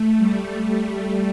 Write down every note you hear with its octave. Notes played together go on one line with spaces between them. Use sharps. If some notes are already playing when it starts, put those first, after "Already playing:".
Already playing: A3
G3